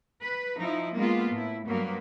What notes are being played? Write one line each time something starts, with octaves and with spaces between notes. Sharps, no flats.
B4
F3 D#4 E4
G#3 A#3 B3 F4
A2 E4
G2 F#3 A#3 B3